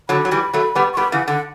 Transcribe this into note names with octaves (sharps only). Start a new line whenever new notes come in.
D3 F#3 B5
F#3
E3 G3
F#3 A3
G3 B3
C#6
G3 B3 B5
C#3 E3 F#5
D3 F#5